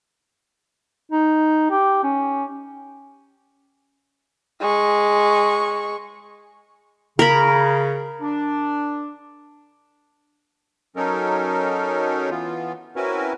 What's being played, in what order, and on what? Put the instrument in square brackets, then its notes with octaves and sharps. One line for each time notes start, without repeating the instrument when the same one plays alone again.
[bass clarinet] D#4
G4
C#4
[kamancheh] G#3 C#6
[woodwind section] C#3 [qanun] A#4 B5
[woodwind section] D4
[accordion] F#3 C#4 D#4 A4 A#4
E3 B3 F4
C4 C#4 E4 F#4 A#4 B4